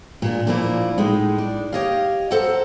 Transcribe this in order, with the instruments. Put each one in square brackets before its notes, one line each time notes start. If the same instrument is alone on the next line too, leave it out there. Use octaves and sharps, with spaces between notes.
[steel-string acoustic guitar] A#2 G#3 D4
A#2 F3 A#3 D4 E4
A2 G#3 D#4
D4
G4 C#5 D#5 F5
A4 C5 E5 F#5 A#5